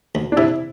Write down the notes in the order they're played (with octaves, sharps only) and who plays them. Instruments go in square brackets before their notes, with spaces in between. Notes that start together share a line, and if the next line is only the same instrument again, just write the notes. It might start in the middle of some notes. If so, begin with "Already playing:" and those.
[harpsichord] D2
[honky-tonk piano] D4
[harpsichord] C3 [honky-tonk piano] E4